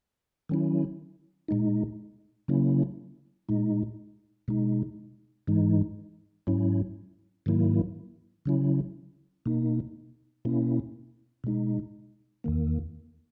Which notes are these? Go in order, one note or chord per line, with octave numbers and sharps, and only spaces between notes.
D#3 F#3 C#4 E4
A#2 G#3 D#4
C#3 F#3 A#3 C#4 E4
A#2 G#3 D#4
B2 G#3 D#4
G#2 E3 G#3 D#4
G#2 F#3 C#4 E4
G#2 D#3 F#3 A#3 E4
C#3 F#3 C#4 E4
B2 A#3 D#4
B2 A#3 C#4 E4
B2 G#3 D#4
E2 D#3 A#3